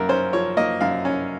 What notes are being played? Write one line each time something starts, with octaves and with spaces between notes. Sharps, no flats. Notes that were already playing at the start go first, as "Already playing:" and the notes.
Already playing: F#2 A#3 A#4
C#4 C5
F3 C#5
A#3 D#5
F#2 F5
C#4